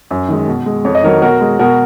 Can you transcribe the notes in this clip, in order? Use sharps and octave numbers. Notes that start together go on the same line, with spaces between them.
F#2
D#3 G#3
B2
G#3
F2 C#5
D#5
D#3 F#3 A#4 C#5
B2 F#4 A#4
G#3
B2 F#4 A#4